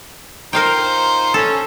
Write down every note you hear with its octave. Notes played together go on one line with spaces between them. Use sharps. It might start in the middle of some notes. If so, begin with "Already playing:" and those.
D#4 F4 A#4 C5 F5 G5
C#4 A4